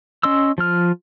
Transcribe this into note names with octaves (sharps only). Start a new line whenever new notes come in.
C#4 D#5 C6 E6
F3 F4 F6